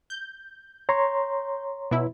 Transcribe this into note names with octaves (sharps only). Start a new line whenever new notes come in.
G6
C#5 A#5 C6
B2 E4